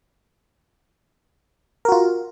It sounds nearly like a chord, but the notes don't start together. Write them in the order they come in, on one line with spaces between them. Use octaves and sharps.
A#4 F#4 F4